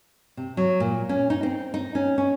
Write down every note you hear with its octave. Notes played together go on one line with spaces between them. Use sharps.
C3
F#3
A#2
C#4
D#4
C4
D#4
C#4
C#4